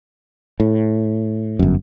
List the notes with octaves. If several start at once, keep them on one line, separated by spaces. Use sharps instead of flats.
A2
G1 F#2